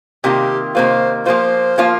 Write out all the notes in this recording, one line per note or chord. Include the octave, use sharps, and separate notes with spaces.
C3 D#3 A#3 F4 G4
C3 D#3 A#3 F4 C5
F3 A#3 F4 C5
F3 A#3 F4